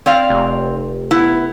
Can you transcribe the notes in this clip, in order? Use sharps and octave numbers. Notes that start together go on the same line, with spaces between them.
C4 D5 F5
F1
B3 E4